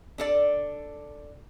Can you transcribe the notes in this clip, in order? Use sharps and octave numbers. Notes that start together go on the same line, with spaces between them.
D4 A4 D5